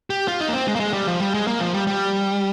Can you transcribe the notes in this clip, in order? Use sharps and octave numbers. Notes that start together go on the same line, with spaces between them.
G4
F4
D#4
A#3
C4
G#3
A#3
G#3
G3
F3
G3
G#3
A#3
F3
G3
G3